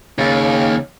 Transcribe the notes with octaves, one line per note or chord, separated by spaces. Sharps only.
D#2 C#3